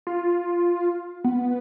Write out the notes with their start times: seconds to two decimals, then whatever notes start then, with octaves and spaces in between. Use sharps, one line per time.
0.07 F4
1.24 B3